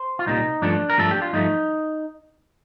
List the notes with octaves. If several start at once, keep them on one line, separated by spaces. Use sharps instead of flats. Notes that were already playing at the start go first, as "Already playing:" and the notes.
Already playing: C5
F4
C2 A#2 G3 D#4
G2 F3 A3 D4
A#4
G2 F3 A3 A4
G4
F4
G2 F3 A3 D#4